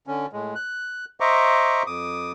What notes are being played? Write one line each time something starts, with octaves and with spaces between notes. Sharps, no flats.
D3 C#4
A2 G#3
F#6
C5 D#5 E5 A#5 C#6 D6
F2 D6 D#6